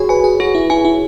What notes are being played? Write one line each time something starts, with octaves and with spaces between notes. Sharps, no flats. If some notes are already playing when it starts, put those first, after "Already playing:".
Already playing: F#4 G#4 C#5
B4 G#5
G#4
F#4 G#4
E4
E4 G#5
E4